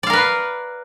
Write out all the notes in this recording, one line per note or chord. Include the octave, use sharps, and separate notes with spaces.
A#4 B4 D5 F5